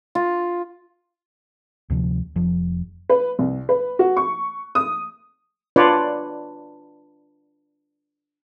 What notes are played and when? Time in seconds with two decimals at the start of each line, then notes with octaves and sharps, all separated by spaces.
0.15 F4
1.90 D2 C3 F3
2.36 F1 F3
3.09 B4
3.39 C2
3.69 B4
3.99 F#4
4.17 C#6
4.75 D#6
5.76 D4 F4 B4 C#5 D5